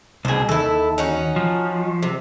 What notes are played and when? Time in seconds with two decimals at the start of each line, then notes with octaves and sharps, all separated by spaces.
0.25 C2 B2 G#4 C5
0.49 D#2 E4 A4
0.98 C#4 D#4 F#4
1.36 F3
2.03 C3